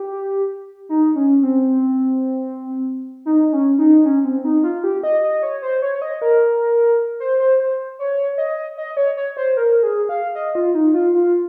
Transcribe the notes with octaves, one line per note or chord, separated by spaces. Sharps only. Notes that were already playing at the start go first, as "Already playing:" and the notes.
Already playing: G4
D#4
C#4
C4
D#4
C#4
D#4
C#4
C4
D#4
F4
G4
D#5
D#5
C#5
C5
C#5
C#5
D#5
A#4
C5
C5
C5
C#5
D#5
D#5
C#5
C#5
C5
A#4
G#4
F5
D#5
F4
D#4
F4
F4